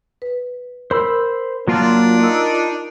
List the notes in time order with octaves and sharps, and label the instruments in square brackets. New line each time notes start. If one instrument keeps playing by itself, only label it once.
[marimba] B4
[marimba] A#4 [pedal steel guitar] C5 B5 E6
[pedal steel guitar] F#3 A#3 D5 [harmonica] D4 [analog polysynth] F4
[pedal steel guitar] D#4 [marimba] A#4 E6